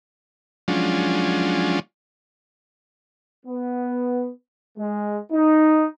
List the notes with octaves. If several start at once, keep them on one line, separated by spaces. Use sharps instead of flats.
F3 F#3 G#3 C#4 D4 F4
B3
G#3
D#4